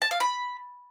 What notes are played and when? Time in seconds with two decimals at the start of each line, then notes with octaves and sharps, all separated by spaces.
0.02 A5
0.11 F5
0.20 B5